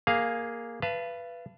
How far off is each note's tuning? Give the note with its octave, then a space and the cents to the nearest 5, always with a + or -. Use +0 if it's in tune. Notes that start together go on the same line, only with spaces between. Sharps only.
A#3 +0 G#4 +0 F5 +0
B4 +0 F5 -40 A5 +0